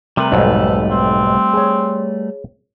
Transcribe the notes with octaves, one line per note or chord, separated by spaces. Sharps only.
C3 G3 A3 A#4 B4
B1 F2 G#2 A4
C4
G#4 C#5